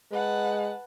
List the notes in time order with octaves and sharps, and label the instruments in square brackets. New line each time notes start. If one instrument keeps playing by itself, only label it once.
[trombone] G#3 [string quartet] B4 F#5 A5